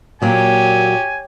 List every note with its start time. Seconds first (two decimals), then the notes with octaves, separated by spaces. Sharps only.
0.22 A#2 F#3 A#3 G4 C#5 G#5